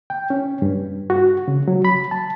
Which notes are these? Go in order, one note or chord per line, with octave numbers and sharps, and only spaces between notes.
G5
C#4
G2
F#4
C#3
F#3
B5
A5